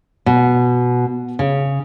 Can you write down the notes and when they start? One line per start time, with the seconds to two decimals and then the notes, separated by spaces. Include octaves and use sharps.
0.26 B2
1.39 C#3